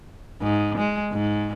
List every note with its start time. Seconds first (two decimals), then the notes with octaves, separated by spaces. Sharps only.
0.41 G#2
0.78 G#3
1.12 G#2